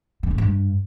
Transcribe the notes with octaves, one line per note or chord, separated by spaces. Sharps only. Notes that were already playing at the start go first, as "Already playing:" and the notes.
D3
G#2
G2